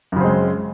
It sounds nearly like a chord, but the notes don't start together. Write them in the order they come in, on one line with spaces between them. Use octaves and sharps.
F#2 C#3 C4 G#3